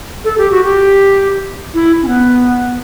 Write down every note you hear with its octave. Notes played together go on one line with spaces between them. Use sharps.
A4
G4
F#4
G4
E4
C#4
B3